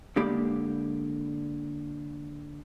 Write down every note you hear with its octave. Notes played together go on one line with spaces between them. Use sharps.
D3 G#3 A#3 G4 D5 B5